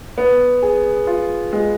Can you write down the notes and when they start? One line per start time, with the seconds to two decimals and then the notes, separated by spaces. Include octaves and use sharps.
0.18 B3
0.62 G#4
1.07 F4
1.53 G#3